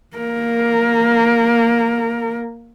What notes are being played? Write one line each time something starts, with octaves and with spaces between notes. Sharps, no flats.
A#3 A#4